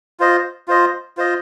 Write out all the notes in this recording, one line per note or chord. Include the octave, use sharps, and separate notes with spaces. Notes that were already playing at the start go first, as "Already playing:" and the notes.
F4 C5 D#5
F4 C5 D#5
F4 C5 D#5